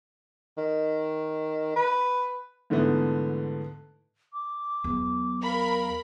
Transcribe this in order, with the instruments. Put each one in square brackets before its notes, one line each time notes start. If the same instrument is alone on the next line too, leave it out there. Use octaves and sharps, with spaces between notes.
[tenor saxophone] D#3
B4
[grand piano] G#2 D3 E3 A3 B3
[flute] D6
[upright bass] E2 F#3
[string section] A#4 B5 [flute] F5